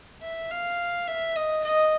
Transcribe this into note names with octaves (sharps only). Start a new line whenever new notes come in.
E5
F5
E5
D#5
D#5